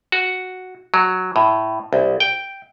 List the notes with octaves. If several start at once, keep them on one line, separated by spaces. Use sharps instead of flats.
F#4
F#3
A2
C2
G5